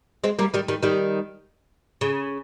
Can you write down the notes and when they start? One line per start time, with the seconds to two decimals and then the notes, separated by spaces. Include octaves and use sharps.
0.24 G#3 C4
0.39 G3 A#3
0.54 D#3 G3
0.68 D#3 G3
0.83 D#3 G3
2.01 C#3